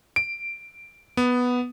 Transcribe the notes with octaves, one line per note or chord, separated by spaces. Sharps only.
D7
B3